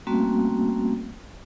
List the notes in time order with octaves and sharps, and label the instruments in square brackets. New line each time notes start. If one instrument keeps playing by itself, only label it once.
[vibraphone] G3 A3 A#3 C4 C#4 F#4